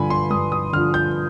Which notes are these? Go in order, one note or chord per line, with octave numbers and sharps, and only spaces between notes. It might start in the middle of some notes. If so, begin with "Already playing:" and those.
Already playing: G2 D3 F3 G#5 B5
C6
G2 D#6
D#6
D3 F3 F6
G6